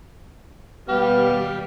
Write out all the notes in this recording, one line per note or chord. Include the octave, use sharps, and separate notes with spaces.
D#2 B2 G3 B3 G4 F5